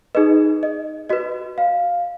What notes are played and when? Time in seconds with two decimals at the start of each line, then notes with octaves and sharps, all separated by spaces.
0.15 D#4 G#4 B4 D#5
0.63 D#5
1.09 F#4 B4 D#5
1.58 F5